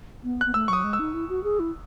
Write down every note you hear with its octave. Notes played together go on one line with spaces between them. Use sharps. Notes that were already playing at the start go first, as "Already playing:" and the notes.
B3
B3 F#6
A3 E6
F#3 C#6 D#6
G#3
E6
D#4
E4
F#4
G#4
E4